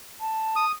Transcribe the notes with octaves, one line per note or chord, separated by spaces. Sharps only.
A5
D#6